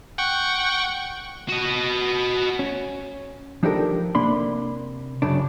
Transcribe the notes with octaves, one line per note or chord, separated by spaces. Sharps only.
F#5 G5 C#6
F#4 D#5
C#4
F3 D4 D#4 G4 A4 A#4
C3 A#3 D4 B5 C6
F#2 C#3 D4